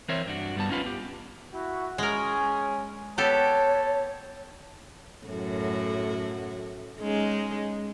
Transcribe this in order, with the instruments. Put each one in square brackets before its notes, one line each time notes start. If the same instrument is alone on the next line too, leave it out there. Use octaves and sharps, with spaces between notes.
[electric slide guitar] E3 C4 A#4 C5 C#5 E5
G2 D4 F#4
G2 G3 B3 A5
C#4 D#4 F4 B4
B3 G4
[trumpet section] E4 F#4
[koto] G#3 A#4 [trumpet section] C#4 G#4 C#5
[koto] B3 G4 A4 [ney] C#5 [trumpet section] A5
[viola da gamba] F#2 A2 F#4
G#3 C#4 D#4